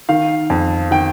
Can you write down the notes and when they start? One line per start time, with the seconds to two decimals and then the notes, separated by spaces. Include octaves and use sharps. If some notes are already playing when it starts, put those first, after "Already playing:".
0.09 D#3 F5
0.50 F2
0.91 D#3 G5